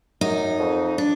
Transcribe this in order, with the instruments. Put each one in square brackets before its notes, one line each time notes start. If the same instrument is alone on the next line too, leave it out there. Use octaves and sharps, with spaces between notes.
[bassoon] F#2 [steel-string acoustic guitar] D#4
[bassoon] F2
[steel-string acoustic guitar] D4